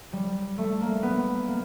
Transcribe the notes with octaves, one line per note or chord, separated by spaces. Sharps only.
G3
A3
A#3
B3
A#3